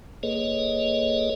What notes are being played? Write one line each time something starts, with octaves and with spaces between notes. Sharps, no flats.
A#3 G#4 A4 B4 C#5 D#5